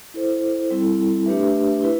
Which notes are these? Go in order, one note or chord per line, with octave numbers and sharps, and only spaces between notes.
E4 A4 C5
G3 C4 E4 A4
A3 D4 G4 B4 E5
E4 B4